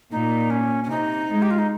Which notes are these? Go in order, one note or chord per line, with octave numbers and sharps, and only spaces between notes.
A#2 D#4
C#4
C#4
C3 D#4
G#3
G4
F4
D#4